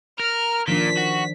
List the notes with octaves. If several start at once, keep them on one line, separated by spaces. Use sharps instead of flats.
A#4 F6
A#2 D#3 F3 D4 B6
F#4